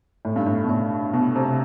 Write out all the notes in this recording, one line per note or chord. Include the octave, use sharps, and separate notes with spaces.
A2
G2
A2
B2
A2
B2
C3